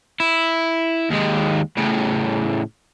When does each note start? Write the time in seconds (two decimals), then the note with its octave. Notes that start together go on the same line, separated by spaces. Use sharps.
0.20 E4
1.10 D#2 G#3
1.77 A2 C#3